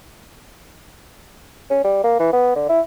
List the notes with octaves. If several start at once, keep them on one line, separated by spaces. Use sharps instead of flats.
C#4
G3
A#3
E3
B3
D3
E4